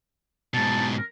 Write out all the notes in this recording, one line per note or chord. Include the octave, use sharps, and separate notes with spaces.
G#2 B2 A5
A#4